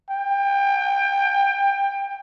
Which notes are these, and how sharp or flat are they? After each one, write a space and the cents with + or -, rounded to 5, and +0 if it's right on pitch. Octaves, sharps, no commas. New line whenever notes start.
G5 +25